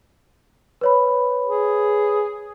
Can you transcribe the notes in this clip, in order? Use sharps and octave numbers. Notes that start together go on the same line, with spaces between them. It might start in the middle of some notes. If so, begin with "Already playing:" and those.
B4 C#5 B5
G#4